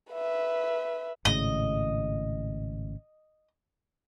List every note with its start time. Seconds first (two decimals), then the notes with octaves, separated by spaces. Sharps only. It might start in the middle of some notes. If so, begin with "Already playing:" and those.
0.12 B4 E5
1.25 G#1 A2 C#3 D#5